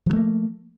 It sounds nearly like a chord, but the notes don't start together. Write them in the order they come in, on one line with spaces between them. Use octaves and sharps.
F3 F#3 A3 A#3